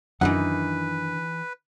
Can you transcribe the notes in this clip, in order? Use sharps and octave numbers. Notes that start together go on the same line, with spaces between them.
F#2 D#3 E3 D4 D#4 B4 F#5